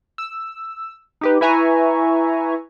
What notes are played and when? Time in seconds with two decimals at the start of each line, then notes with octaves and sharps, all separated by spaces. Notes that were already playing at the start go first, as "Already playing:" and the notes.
0.18 E6
1.21 D#4 G4 B4
1.41 E4 B4 E5 G#5 A#5 C#6